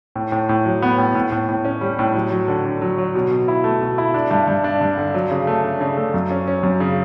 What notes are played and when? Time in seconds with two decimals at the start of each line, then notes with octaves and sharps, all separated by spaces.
0.16 A2
0.32 A2
0.49 A2
0.65 F#3
0.82 B3
0.98 A2
1.15 A2
1.32 A2
1.49 A2
1.65 C#4
1.81 G3
1.99 A2
2.15 F#3
2.32 F#3
2.48 D3
2.65 D3
2.81 F#3
2.98 F#3
3.15 B2
3.31 B2
3.48 E4
3.64 A3
3.81 B2
3.98 E4
4.14 D4
4.31 G2
4.47 G2
4.64 D4
4.81 G2
4.97 D3
5.14 F#3
5.31 C#3
5.47 A3
5.64 D4
5.80 C#3
5.97 A3
6.14 F#2
6.31 C#4
6.48 C#4
6.63 F#2
6.80 C#3